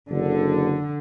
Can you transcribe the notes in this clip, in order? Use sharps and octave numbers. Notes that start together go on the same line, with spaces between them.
F#1 D3